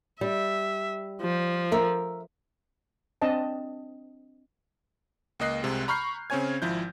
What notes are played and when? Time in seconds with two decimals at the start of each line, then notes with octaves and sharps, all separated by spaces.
0.21 G3 E5
1.22 F3
1.72 A#4 E5
3.22 C4 D4 D#5 A5
5.39 C#2 A#3 D#5 F#6 C7
5.63 C2 C3 G#3
5.88 A#5 B5 C#6 F6 G6 C7
6.30 C#3 C4 C#4 C#5 G#5 G#6
6.62 G#1 F3 E4 G6